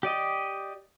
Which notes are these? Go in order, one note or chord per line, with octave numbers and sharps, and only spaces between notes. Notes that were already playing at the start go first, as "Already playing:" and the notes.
G4 D5 D#5